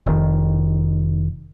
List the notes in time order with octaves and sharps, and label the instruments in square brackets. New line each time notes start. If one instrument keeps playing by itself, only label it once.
[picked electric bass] F1 D#3